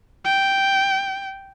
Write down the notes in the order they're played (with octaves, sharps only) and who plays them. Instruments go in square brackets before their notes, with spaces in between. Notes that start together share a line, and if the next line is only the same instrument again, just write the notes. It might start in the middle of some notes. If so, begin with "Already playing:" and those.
[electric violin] G5